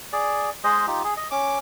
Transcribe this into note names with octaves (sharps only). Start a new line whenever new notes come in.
G#4 D5
G#3 G#4 C5 D#5
D#4 F4 G4
G#4
D#5
C#4 D6